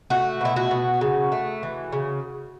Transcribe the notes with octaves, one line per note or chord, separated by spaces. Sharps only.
A3 F#4
B2 E4
F#4
B2
C#3
A3
E3
C#3